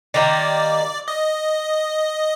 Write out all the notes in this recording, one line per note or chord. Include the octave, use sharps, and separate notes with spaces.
D#3 G3 A#3 D5
D#5